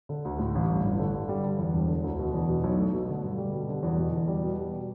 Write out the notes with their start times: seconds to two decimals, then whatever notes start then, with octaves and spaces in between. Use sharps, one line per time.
0.09 D3
0.25 D2
0.39 A2
0.55 A1
0.70 G2
0.84 G1
0.99 D3
1.14 G2
1.29 G3
1.44 G2
1.59 E2
1.73 E1
1.88 D3
2.04 D2
2.19 B2
2.34 E2
2.49 B2
2.64 B1
2.79 A3
2.93 B2
3.09 D3
3.23 G2
3.38 G3
3.53 B2
3.69 D3
3.83 E2
3.98 B2
4.13 E2
4.28 G3
4.44 B2
4.58 G3